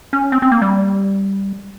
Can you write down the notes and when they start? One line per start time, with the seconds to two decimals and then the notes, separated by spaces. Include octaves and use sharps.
0.13 C#4
0.32 C4
0.42 C4
0.52 A#3
0.62 G3